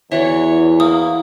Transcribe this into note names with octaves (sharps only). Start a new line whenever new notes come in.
E2 E3 F#4 C#5 D5 E5
A#3 E4 D#6